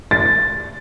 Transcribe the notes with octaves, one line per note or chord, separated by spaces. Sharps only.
A6